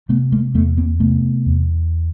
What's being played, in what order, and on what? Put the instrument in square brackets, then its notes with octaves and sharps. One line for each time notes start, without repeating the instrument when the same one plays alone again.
[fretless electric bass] C3 A3 B3
G#3 A#3
E2 A3 B3
A#3 C4
C3 A3 B3
E2